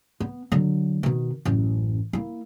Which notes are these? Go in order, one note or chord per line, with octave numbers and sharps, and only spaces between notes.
B3
D3 F#3
B2 D#3
A1 F#2
A#3 E4